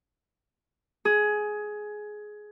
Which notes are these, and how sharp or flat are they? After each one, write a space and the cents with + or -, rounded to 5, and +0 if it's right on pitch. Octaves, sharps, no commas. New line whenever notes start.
G#4 +15